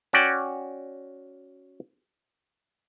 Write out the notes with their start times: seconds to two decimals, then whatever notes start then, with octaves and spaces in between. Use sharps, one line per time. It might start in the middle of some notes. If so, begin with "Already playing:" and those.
0.13 C#4 F#4 D5 G5